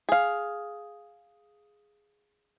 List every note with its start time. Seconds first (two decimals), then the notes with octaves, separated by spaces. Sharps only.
0.09 G#4 F5